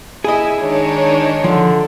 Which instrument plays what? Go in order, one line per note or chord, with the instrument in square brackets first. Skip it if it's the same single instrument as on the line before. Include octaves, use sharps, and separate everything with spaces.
[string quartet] E4 [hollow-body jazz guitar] G#4 D#5 [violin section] E5 G#5
[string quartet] D#3 G#3 D4 [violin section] D#4 C#5
[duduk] D3 [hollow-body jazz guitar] F3